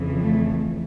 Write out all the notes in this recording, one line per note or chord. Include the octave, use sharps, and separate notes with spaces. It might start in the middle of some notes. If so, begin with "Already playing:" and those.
Already playing: F2 C#3 E3
A3